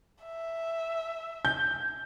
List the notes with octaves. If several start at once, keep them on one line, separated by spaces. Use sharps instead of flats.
E5
G6